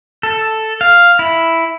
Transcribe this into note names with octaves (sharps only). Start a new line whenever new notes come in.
A4
F5
E4